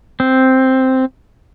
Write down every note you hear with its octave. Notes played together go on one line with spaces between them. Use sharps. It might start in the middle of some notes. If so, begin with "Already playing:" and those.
C4